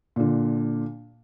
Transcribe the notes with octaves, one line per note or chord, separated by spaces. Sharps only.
A#2 D3